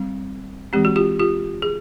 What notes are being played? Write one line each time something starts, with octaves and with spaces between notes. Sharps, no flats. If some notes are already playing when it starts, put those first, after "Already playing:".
Already playing: G3 C4
E3 G#3 C4 G4
F#4
F4 G4
F4 G4
G#4